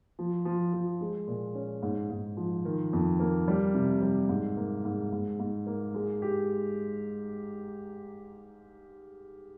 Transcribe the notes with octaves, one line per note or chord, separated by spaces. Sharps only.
F3
F3
F3
G#3
A#2
C#4
G#2
G#2
F3
D#3
F2
A#3
G3
C3
G3
G#2
A#3
G#2
G#2
G#2
A#3
G#3
G4